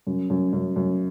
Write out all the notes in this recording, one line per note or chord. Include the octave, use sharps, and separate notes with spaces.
F#2
F#2
F#2
F#2